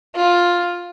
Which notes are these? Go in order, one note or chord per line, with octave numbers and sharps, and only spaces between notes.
F4